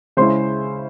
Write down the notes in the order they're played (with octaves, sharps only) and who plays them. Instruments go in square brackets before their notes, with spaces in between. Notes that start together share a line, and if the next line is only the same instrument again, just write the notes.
[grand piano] C#3 G#3 C#4 E4 C5 C6